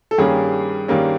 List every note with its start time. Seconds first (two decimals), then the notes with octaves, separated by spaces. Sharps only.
0.11 A4
0.18 G2 D#3 G3 A#3 C#4 G#4
0.88 G2 D#3 G3 A#3 C#4